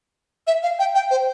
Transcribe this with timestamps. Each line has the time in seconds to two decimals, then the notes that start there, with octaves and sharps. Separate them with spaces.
0.47 E5
0.63 F5
0.79 G5
0.95 G5
1.11 C5